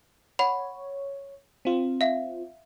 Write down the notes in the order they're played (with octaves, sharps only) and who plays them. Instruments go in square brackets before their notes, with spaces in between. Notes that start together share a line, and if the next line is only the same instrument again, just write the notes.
[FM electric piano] C#5 [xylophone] F#5 B5
[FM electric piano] C4 F4
[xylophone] E5 F5